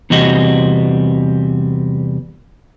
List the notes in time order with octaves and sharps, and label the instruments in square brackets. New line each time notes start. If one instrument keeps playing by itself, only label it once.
[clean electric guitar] E2 C3 G3 C4 F#4 D#5